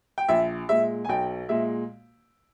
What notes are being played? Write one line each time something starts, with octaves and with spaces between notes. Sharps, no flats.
G5
A#1 E5
A#2 G#3 E5
G#5
B1 G5
A#2 G#3 E5